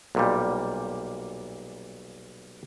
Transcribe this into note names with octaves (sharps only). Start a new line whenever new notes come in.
B1 A#2 G3